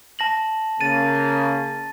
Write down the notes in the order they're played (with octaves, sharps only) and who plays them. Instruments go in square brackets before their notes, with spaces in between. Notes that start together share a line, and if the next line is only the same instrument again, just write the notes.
[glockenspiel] A5 A#6 F#7
[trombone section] C#3 A#3 [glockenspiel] A6 D#7